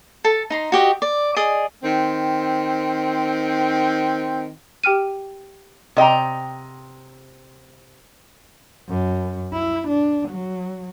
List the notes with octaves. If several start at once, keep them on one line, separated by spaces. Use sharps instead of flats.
A4 A5
D#4 A#5 C6
F#4 G4 D#5
D5
G#4 D5 D#5 D#6
D#3 C4
G4 G5 F6 D#7
C3 D#5 G5 A#5
F#2
E4
D4
F#3